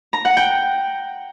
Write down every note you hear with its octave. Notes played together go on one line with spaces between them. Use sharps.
A#5
F#5
G5